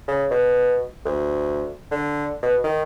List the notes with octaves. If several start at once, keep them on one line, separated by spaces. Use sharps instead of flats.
C#3
B2
D2
D3
B2
D#3